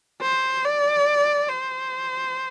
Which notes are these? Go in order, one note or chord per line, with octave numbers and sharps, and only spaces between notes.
C5
D5
C5